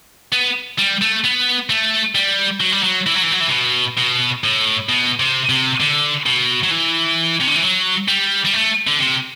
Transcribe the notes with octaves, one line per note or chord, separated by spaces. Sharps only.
B3
G3
A3
B3
A3
G3
F#3
G3
F#3
E3
F#3
E3
F#3
E3
C3
B2
B2
A2
B2
C3
C3
D3
B2
F#3
E3
C3
D3
E3
F#3
G3
G3
A3
D3
C3